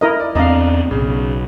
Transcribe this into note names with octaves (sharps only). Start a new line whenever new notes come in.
E4 A#4 D#5
D5
E2 C4 D4 D5 D#5 F5 A#5
B1 C#3